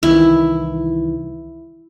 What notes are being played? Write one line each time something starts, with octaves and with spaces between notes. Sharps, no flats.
C2 D#3 E3 E4